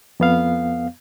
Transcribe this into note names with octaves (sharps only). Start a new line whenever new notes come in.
F2 B3 F5